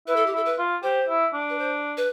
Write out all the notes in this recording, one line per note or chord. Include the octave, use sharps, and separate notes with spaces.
E4 B4
A4
G4
E4 A4
B4
F4
G4 C5
E4
D4
B4
C5
B4